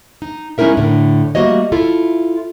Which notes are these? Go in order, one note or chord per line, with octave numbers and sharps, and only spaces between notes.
D#4
G#3 C#4 D#4 E4 A#4 E5
A2 D3
G3 A3 A#3 F#4 C#5 D#5
E4 F4 A4